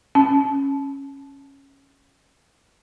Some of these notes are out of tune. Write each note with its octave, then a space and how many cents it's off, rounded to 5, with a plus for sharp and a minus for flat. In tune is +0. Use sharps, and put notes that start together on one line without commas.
C#4 -10 A5 -20